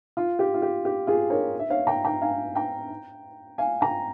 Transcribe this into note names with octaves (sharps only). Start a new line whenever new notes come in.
F4
G4
F4
G4
G4
F4 G#4
A#4 C#5
E5
C#5 F5
G5 A#5
G5 A#5
F5 G#5
G5 A#5
F5 G#5
G5 A#5